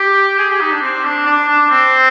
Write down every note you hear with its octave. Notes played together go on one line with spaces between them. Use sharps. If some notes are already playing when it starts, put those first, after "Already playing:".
Already playing: G4
G#4
G4
D#4
D4
C4
D4
D4
D4
C4